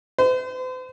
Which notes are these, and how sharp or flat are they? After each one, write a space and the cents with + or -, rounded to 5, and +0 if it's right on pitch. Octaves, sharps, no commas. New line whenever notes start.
C5 -45